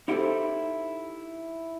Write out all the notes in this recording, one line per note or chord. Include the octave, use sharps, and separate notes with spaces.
D#4 E4 G4 A4 C5